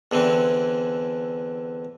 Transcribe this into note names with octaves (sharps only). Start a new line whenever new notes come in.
E2 D3 E3 C4